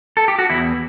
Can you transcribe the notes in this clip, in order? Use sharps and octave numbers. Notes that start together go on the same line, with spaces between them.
A4
G4
F#4
E2 E4